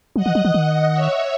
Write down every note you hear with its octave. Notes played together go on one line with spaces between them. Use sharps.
F#3 D#5 F#5
E3
F#3
E3
D#3
C#5 E5